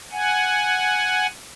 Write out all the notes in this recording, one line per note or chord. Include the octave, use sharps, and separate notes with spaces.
F#5 G#5